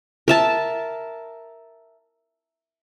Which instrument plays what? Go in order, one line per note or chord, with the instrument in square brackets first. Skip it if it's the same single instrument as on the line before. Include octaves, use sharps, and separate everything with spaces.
[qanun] A#4 E5 A5